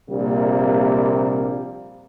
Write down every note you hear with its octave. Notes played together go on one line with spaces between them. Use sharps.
A#1 C3 G3 A#3